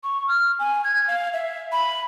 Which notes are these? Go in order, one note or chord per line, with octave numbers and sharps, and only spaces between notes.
C#6
F6
G#5
G#6
F5
E5
B5